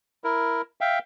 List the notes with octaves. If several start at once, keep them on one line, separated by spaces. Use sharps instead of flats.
E4 A#4
E5 F5 G5